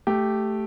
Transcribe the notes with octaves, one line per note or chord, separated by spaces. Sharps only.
A3 G4